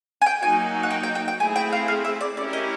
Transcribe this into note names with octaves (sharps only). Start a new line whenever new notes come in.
G#5
G5
F#3 A#3 D#4 F#4 G#5
F#5
G5
G5
G5
G5
A3 C4 E4 G#4 G#5
G5
F5
F5
E5
D5
C#4 E4 G4 A#4 D5
D#5